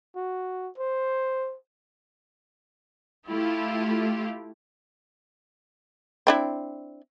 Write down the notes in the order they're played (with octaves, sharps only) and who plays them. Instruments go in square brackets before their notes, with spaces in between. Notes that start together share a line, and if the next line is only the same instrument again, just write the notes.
[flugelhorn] F#4
C5
[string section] A3 E4 F4 G4
[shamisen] C4 D4 E4